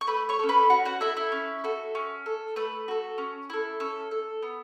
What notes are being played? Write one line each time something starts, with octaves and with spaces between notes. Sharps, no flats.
C#6
A3 B4 B5
C#5 C#6
C#4 A4
B4 B5
C#4 F#4 F#5
F#4 F#5
E4 A4 E5
E4 E5
C#4
F#4 A4
C#4
A4
A3 B4
F#4 A4
C#4
E4 A4
C#4 A4
A4
B3